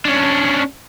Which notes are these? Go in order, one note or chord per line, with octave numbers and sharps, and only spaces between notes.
C#4 D4